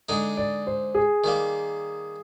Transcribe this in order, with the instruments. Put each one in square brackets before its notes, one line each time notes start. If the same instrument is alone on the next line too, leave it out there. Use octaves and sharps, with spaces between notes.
[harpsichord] D3 G#3 D#4 [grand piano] D5
[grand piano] D5
C5
G#4
[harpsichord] D#3 G3 A#3